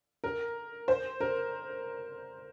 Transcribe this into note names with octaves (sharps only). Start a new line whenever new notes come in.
A#4
C5
A#4